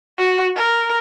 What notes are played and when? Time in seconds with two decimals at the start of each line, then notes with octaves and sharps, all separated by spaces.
0.18 F#4
0.56 A#4